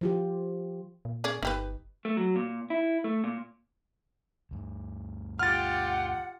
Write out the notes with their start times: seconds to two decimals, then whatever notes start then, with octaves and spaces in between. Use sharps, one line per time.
0.01 F3 F4 G4
1.05 A#2
1.24 C#4 G#4 D5
1.43 G1 D#4 G4 B4
2.05 A3
2.17 F#3
2.36 A#2
2.70 E4
3.04 A3
3.24 A#2
4.51 D2 G2
5.39 F4 G4 F#5 F6 A6